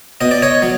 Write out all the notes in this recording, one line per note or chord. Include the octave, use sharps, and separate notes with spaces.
B2 D#5
D5
C#5 D#5
F#3